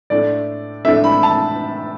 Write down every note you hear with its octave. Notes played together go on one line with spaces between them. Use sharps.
A2 A3 D4 D5
A2 A3 D4 E5
B5
A5